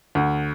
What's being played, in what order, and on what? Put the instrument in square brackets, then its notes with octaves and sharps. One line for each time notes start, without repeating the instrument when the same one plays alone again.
[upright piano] D2